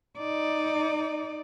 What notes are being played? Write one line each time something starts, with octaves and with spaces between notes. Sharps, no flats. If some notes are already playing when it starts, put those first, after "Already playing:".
D#4 D5